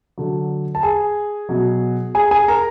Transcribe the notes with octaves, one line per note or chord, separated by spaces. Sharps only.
D3 F#3
A5
G#4 G#5
B2 F#3
G#4 G#5
G#4 G#5
A#4 A#5